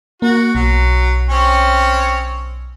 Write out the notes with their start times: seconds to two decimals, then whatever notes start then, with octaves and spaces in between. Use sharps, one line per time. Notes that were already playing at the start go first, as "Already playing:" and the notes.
0.22 A#3 F#4
0.55 B1 F#3
1.29 C4 C#4 C#5